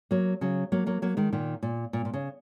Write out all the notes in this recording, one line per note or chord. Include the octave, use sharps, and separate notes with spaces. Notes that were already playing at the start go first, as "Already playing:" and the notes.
F#3 A#3
C#3 F#3
F#3 A#3
F#3 A#3
F#3 A#3
D#3 G#3
A#2 D#3
A#2
A#2
A#2
C#3